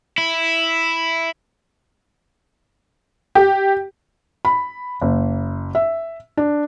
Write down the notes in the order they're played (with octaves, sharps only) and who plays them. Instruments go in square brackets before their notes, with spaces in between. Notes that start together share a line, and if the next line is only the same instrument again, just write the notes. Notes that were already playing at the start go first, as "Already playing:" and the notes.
[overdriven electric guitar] E4
[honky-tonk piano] G4
[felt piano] B5
F#1
E5
D4